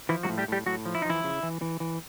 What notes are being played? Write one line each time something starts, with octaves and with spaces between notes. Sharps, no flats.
E3 F3 E4
F#3 F#4
A2
G3 G4
A2 G3 G4
A2 F#3 F#4
F3
E4
D#4
E3 F3 E4
C#3
E3
E3
E3